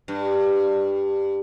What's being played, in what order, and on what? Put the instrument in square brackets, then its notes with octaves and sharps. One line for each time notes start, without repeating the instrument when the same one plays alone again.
[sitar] G2